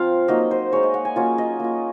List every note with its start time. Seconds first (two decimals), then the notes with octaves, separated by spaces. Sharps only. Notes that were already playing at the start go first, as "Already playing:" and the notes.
Already playing: F3 C4 F4 F5
0.28 F#3 A#3 D#4 D#5
0.51 C5
0.72 G#3 D#4 C#5
0.83 D#5
0.94 F#5
1.05 G#5
1.16 F#3 A#3 C#4 F4 C#5
1.38 D#5
1.60 A#3 F4